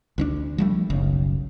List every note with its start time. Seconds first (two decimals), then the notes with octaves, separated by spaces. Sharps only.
0.18 D2 C4 D4
0.58 F3 G3 A3
0.90 F#1 B1 C#3